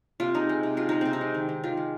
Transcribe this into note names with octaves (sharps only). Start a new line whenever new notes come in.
C3 F4
G#3 D#4
G#3
C3
G#3 F4
G#3 D#4
C3 C4
D#4
G#3
D#3
D#3
D#3 F4
G#3